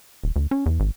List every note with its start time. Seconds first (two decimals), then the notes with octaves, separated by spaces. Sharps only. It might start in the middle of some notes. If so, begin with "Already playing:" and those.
0.24 D#1
0.36 D2
0.51 C#4
0.66 E2
0.80 G#1